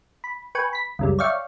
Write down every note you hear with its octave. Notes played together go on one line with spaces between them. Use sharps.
B5
B4 G5 G#5 C#6
B5 B6
C#2 F#2 G3
C#5 D5 E5 F5 G5 C#6